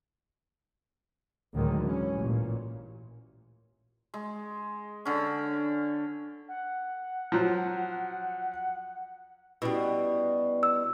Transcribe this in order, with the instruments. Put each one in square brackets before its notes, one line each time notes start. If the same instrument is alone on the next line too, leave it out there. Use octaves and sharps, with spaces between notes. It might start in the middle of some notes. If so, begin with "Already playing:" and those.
[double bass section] D2 A2 D3 D#3 F#3 G#3
E3 C#4
A1 A#2
[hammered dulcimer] G#3
D3 C#4
[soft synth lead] F#5
[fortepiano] F3 F#3
[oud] B2 G3 [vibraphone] C#4 E4
[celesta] E6